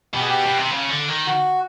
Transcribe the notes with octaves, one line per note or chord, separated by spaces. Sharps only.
B2 G4
G#4
G4
B2
C3
C#3
D3
D#3
F#4